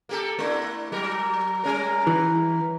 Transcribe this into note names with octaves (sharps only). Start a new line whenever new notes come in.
A#3 G4 A4
A3 D4 E4
F#3 A#4
G3 C#4 A#4
E3